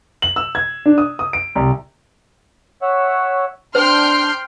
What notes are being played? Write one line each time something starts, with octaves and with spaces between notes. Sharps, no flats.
F#7
E6
G#6
D4
D#6
D#6
D7
C2
C#5 E5 F#5
D4 C5 G5 C6 F6